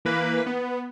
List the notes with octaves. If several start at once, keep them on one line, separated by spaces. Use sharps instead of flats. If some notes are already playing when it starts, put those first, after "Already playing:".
E3 A#3 B4
B3